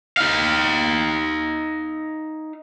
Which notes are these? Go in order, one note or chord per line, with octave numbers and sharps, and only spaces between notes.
D#4 F5